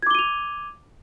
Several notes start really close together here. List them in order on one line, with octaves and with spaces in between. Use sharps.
G#6 D6 G7 D#7 F7